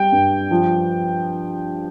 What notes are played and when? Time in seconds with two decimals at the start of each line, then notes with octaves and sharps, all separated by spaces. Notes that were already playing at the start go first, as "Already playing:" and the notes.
Already playing: G3 G5
0.12 G2
0.51 F3